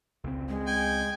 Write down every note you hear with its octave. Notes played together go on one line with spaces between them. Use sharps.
C#2 C#3 C4
G#3
G5 G#5